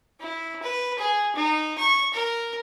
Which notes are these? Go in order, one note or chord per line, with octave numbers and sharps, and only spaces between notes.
E4
B4
G#4
D#4
C#6
A#4